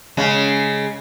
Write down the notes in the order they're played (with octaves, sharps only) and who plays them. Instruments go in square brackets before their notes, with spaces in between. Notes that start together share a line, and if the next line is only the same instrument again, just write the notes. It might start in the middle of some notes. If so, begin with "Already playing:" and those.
[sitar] C#3 G#3